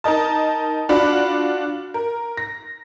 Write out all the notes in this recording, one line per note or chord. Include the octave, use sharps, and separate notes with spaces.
D#4 A#4 D#5 A5
D4 F4 F#4 D5 B5
A#4
A#6